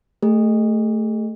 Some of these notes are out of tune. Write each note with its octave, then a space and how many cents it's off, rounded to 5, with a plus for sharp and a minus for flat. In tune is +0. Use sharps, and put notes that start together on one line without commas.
A3 +0 G#4 -45